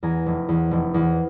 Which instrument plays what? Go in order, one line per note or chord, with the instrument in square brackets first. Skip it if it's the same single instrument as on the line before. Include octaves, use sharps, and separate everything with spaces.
[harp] E2 G#5 A#5
F1
E2
F1
E2